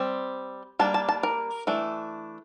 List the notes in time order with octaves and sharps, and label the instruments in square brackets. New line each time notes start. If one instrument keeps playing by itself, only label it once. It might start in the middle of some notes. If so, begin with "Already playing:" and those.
Already playing: [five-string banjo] G3 C4
G3 A#3 D4 A5
A5
A5
A#4
E3 A3 D4